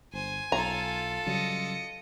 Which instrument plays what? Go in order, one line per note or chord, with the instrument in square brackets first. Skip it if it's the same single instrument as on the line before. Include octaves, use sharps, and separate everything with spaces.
[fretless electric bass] G1 [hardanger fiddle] C5 [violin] G#5
[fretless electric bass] B1 [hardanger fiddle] F4 A4 [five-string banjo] A#5
[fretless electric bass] C#3 F#3 G3 [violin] D#5 C#7